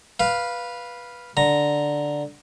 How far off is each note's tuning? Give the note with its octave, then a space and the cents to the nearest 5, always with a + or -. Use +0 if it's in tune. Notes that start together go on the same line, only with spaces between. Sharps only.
B4 -10 F5 +0
D3 +0 A#5 +0